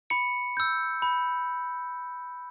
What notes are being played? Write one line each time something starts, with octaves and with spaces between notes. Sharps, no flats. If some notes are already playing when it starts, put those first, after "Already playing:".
B5 C#7
E6 G6
B5